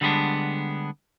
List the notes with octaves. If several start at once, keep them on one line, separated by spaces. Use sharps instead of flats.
D3 G3 G#3 B3 D4